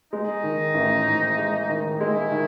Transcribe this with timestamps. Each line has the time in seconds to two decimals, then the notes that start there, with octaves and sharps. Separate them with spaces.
0.12 G#3 D#4
0.43 D#3
0.74 A1
1.07 G#2
1.38 G#3
1.69 D#3
2.00 G#3 E4
2.32 D#3